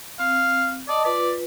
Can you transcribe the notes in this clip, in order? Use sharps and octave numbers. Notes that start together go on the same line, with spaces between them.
C4 F5
D5 D#5 A5 D#6
F4 B4 D5